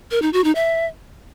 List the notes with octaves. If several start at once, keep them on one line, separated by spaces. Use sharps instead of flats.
A#4
D#4
F#4
D#4
E5